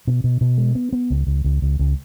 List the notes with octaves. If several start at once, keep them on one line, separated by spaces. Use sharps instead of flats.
B2
B2
B2
G#3
B3
B3
C#2
C#2
C#2
C#2
C#2